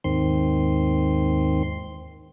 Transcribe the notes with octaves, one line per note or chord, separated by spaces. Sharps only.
D#2 G#2 D#3 C4 C6